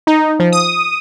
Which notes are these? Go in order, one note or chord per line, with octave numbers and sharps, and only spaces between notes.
D#4
F3
D#6